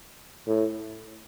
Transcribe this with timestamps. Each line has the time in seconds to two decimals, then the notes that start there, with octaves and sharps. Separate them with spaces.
0.47 A2